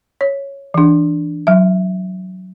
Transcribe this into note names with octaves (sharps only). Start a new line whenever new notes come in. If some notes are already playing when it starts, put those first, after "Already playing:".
C#5
E3 D4
F#3 E5